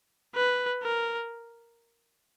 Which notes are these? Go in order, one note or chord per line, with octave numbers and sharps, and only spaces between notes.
B4
A#4